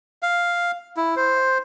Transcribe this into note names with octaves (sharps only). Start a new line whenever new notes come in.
F5
E4
C5